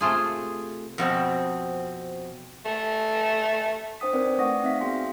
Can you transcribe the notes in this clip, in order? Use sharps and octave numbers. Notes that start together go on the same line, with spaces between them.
C3 A3 F4 G#4
F2 B2 C4
A3
D4 C5 G5 D#6 B6
C4 D#4 A#4 B4 D5 G5
A3 D5 F#5 C#6 D#6 A#6
C4 D#4 E5 F5 B6
B3 F#4 G#4 E5 G5 C6